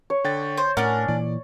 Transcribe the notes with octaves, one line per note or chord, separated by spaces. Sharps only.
C#5
D3 G5 A6
C5
A2 C#4 D4 A#4 F#5
A#2 E3 D5